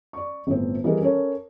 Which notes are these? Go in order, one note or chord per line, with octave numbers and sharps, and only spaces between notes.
D5 C#6
G1 A2 C4
E3 G3 C4 G#4 A#4 D#5
C#4 A4 A#4 C#5